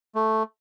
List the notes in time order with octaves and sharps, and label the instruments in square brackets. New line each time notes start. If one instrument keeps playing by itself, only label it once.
[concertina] A3